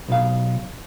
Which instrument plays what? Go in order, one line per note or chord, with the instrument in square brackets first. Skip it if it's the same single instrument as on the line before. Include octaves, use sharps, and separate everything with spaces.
[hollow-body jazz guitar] B1 B2 F5